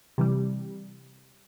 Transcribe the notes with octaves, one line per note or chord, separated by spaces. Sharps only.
C3 E3 G3